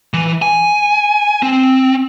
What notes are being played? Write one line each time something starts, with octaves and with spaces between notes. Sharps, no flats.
E3
G#5
C4